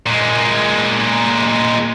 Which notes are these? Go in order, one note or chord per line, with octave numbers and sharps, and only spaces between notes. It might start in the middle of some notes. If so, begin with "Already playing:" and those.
A#2 G#3